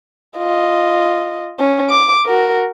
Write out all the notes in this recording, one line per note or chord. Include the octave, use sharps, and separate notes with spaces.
F4 D#5
C#4
D6
F#4 A#4